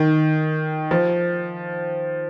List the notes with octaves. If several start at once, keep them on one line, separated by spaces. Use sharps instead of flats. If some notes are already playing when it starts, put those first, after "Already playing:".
Already playing: D#3
F3